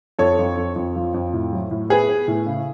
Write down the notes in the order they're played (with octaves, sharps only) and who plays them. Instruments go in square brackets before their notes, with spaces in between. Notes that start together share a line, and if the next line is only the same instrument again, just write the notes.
[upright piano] F2 A4 C#5
F2
F2
F2
F3
F2
A2
F#3
A2
B3 G#4 B4
B3
A2
C#3